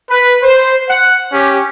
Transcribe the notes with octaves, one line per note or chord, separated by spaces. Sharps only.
B4
C5
F#5
C#4 G4